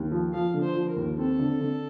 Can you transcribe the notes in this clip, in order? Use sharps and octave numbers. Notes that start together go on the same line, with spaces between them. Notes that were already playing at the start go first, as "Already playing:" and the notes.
Already playing: D#2
F3
F3 F5
D3
C5
F3
A#4
D#2
C4 A4
D3
D3